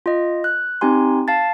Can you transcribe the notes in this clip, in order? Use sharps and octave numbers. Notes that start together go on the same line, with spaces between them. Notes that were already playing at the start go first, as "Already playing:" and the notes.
F4 D#5
F#6
C4 D#4 G4 G#5 C6
F5 A5 A6